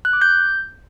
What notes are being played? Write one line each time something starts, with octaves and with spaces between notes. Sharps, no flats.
F#6
D6
G6